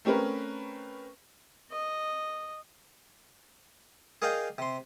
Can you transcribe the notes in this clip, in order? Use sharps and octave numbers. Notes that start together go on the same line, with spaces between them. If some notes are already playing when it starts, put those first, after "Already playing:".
A3 C4 C#4 A#4 B4
D#5
G#4 A#4 D5 D#5 F5 G5
C3 C6